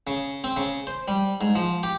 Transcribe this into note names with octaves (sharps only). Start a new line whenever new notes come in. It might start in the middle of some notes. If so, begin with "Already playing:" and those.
C#3
C4
C#3
C5
G3
G#2
F3
G4